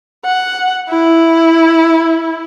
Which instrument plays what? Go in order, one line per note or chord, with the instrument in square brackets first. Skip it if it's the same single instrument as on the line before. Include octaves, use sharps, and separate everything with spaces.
[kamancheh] F#5
E4